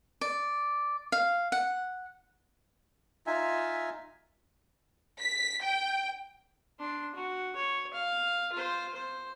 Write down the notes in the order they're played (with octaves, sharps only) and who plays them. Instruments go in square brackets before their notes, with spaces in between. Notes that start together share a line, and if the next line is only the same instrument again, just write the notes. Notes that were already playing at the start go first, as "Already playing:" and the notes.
[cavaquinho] D5
F5
F#5
[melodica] D#4 F4 E5 G#5
[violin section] B6
G5
[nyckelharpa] D4 C6
F#4
C#5
F5
F4 C5
C5